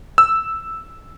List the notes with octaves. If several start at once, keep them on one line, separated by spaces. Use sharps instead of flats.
E6